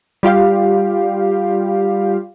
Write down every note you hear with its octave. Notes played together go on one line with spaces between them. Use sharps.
G3 F4 G4 F5